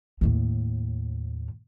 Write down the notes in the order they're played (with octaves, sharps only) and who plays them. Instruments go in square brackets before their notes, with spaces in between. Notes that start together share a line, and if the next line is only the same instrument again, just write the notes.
[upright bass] D#2 A2